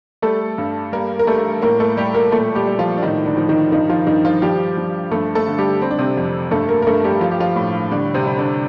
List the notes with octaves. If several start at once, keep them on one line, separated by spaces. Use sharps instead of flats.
G3 A3 A4
G2
G3 A#3 A#4
A#4
G3 A3 A4
A2 A#3 A#4
A3 A4
G3 G4
A#3 A#4
A#2 A3 A4
G3 G4
G3
F3 F4
D4
A2 D#3 D#4
D3 D4
F3
D#3 D#4
G2 D#3 D#4
F3 F4
G2 D#3 D#4
F3 F4
F3 G3 G4
F3
G2 A3 A4
A3 A4
D3
G3 G4
G3 C4
D4
C3 C4
F2
G2 A3 A4
A#3 A#4
A#4
G2 A3 A4
G3 G4
F3 F4
G4
F3 F4
A2
D3 G3 D4
C3 C4
G3
D3 D4